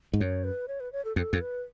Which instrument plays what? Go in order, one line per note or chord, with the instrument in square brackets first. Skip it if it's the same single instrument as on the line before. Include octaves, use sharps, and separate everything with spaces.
[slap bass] G#2
[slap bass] F#2 [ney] C#5
[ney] B4
C#5
B4
C#5
A4
[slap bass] F2 [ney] A4
[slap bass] F2
[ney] B4